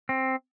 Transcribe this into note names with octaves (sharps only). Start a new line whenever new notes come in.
C4